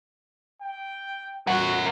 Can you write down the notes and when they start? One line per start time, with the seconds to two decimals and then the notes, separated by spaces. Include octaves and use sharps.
0.61 G5
1.47 F#4 A#4 F#5